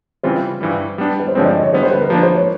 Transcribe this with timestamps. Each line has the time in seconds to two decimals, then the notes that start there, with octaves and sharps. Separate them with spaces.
0.23 C#3 E3 G3 C4 F4 C5
0.61 G2 E3 G3
0.98 G3 B3 D4
1.20 B4
1.28 C5
1.35 G2 D3 F3 G#3 C4 C#5
1.45 D5
1.55 D#5
1.63 C#5
1.73 D3 G3 B3 C5
1.83 C5
1.91 B4
2.01 A#4
2.10 F3 A#3 D4 B4
2.23 C5
2.35 C#5